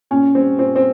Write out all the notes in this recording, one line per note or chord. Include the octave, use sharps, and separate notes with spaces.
A#2 C#4
G3 C4
A#2 C4
C4